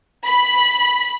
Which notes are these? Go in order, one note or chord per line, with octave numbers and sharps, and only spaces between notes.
B5